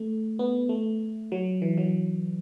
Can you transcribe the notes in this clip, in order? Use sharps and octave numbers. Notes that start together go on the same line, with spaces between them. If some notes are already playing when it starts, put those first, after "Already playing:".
Already playing: A3
B3
A3
F#3
E3
F#3